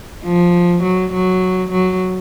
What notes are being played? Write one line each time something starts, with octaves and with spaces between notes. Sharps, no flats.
F3
F#3
F#3
F#3